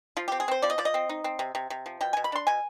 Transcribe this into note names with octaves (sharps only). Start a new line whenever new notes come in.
F3 F4
C4 G4
G#4
C4 C5
F3 D5
D#5
F3 D5
D#5
C4
D#4
C4
C3
C3
C3
F3
B2 G5
B2 G#5
B5
D4 C6
B2 G#5